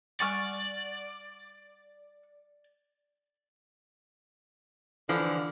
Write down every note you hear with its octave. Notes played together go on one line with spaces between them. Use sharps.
G3 D5 F#5 G#5 C#6 D6 F6 A6
D3 E3 F3